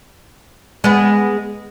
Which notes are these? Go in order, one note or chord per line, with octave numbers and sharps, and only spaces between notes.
G#3 B3